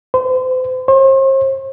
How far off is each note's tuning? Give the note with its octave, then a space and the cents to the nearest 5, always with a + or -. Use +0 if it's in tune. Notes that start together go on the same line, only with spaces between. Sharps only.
C5 -40
C5 +40